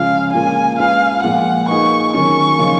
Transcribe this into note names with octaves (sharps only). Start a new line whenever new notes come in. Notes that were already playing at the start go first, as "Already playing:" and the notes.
Already playing: C#3 F3 G#3 C#4 F4 F5
A#2 G#3 C#4 F4 A#4 G#5
G#3 C#4 F4 B4 F5
A#2 F3 G#3 F#5
A#3 D#4 G#4 B4 C#6
D#3 F#3 A#3 C#4 F4 C#6
C#3 F3 A#3 D#4